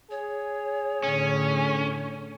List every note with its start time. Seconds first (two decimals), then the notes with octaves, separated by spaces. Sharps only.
0.11 G#4 C#5
1.03 A2 D3 C#4